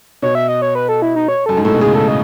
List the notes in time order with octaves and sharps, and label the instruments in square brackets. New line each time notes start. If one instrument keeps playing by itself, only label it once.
[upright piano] B2 [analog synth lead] C#5
[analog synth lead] E5
D#5
C#5
B4
A4
E4
D#4
C#5
[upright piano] F#2 [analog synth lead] A4
[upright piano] G#2
[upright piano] A2 [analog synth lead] A4
[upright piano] B2
[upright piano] C#3 [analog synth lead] G#4
[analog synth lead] A4
D#5